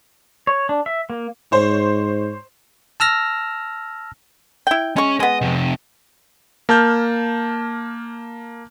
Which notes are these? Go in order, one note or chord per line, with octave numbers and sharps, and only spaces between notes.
C#5
D4
E5
A#3
G#2 C5 C#5
A5 E6 F6 A#6
E4 G5
G#3 C#4 C#6
G#3 B3 D#5
F2 C3
A#3 A5 F6 G6